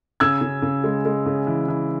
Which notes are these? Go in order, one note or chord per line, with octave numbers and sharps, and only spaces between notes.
C#3 E6 G#6
C#3
C#3
G#3
G#3
C#3
E3
E3